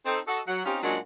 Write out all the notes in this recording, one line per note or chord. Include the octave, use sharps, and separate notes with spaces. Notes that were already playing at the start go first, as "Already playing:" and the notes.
C4 D#4 A4
F#4 A4 D#5
F#3 F#5
C4 C#4 D#4 F4 G4
A#2 F#3 G#3 C#4 D4 F#4